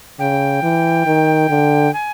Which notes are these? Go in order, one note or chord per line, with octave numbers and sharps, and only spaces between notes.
C#3 G5
E3
D#3
D3
G#5